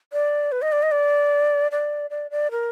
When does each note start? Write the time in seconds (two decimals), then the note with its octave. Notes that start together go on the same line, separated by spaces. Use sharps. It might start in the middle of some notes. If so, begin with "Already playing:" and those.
0.13 D5
0.52 B4
0.62 D#5
0.72 D5
0.83 D#5
0.91 D5
1.72 D5
2.10 D5
2.31 D5
2.51 A#4